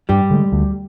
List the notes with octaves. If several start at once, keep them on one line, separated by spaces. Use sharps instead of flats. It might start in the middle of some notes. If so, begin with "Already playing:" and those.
G2 G3 G4
D3 G#3
D2